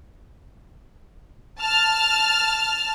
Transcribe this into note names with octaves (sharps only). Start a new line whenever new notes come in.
A5 F6